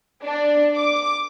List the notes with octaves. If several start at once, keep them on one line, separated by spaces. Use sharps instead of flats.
D4
D6